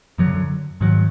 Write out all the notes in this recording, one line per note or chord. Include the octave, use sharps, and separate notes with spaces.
F#2 D3 F#3
G#2 D#3 F#3